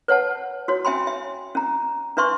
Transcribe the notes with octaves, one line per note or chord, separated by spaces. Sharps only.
B4 C#5 F#5 A5
F#4 C#5
C#4 E5 G5 G#5 B5 C6
E5
C#4 A#5
D4 B4 E5 C6 C#6